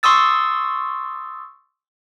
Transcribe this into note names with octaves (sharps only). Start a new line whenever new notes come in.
C6 C#6 D#6 E6 A6